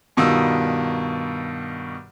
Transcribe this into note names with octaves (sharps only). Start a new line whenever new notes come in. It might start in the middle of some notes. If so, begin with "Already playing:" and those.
G2 B2 D#3 G3 F4 E6